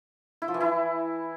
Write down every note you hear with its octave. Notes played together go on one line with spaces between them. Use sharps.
E4
F3
E3
E4